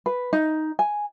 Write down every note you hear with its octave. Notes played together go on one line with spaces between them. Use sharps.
B4
D#4
G#5